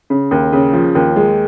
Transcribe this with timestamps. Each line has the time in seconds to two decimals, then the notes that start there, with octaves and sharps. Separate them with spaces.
0.10 C#3
0.31 D#2
0.53 C#3
0.73 F3
0.95 D#2
1.16 G#3